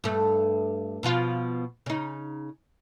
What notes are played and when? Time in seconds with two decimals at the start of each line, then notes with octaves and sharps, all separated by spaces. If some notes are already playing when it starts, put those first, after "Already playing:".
0.04 G2 A3
1.03 B2 F3 F4
1.86 C#3 D#4